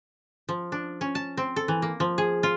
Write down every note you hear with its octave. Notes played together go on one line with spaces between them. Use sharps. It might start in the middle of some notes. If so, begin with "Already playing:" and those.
F3
D4
C#4
A5
C4
A4
E3
A#3
F3
G#4
F4